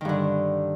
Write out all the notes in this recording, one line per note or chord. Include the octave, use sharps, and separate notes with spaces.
G2 D3 D#3